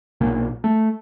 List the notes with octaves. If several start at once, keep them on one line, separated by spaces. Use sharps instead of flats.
B1 A#2 A#3
A3